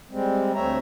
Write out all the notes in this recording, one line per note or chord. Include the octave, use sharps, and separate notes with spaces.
G3 G#3 C4
D2 A3 C4 C#5 E5 A#5